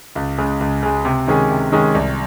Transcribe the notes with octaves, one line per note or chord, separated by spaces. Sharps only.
C#2
C#3 G#3
C#2
C#3 G#3
C3
D#3 G#3 C#4 G#4
C3
D#3 G#3 C#4 G#4
C2